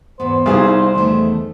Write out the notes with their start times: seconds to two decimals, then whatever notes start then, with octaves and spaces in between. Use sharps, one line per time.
0.20 E2 G#2 B3 C5
0.46 C2 D#4 F#4 G#4 F5
0.95 E2 D#3 A3